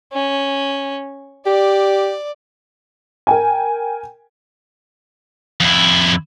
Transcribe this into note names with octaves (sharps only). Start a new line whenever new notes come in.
C#4
G4 D5
A#4 G5 G#5
F2 E4